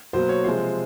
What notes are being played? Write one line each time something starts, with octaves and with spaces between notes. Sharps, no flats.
B2 F#3 A#3 C5
C#5
C3 F3 G#3 C5